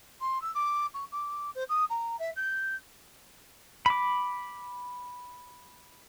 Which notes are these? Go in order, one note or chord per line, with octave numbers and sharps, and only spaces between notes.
C6
E6
D6
C#6
D6
C5
D#6
A#5
E5
G6
B5 D6